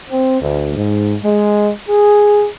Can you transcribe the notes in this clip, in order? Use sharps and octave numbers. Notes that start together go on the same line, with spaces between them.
C4
D2
G#2
G#3
G#4